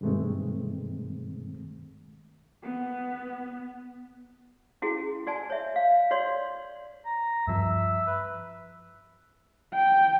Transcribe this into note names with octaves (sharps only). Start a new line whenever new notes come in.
G2 B2 D#3 G#3 A3 C4
B3
C#4 E4 F#4 G#4
F#4 D5 G#5 A5
C#5 E5
F5
F#4 C#5 D5 C6
A#5
G2 F3 E5
B4
G5